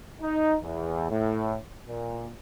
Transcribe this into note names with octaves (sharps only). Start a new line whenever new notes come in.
D#4
E2
A2
A#2